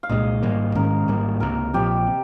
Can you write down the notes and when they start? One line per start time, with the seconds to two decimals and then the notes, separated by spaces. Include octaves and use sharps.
0.03 F5
0.09 C2 A#2 F3 G#3 D#5
0.43 G#1 G#2 G3 A#3
0.75 G#2 D#3 G#3 C#4 A#4
1.08 G#1 G#2 G3 A#3
1.40 C#2 C3 F3 A#3 A#4
1.73 A#1 A#2 F3 C4 G4
2.07 C3